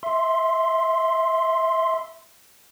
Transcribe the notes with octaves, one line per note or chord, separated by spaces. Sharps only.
E5 C6